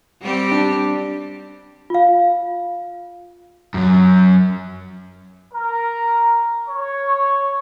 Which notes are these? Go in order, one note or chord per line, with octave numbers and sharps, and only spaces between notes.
G3 C4 G4
D4
F4 F5
F#2 F#3
A#4
C#5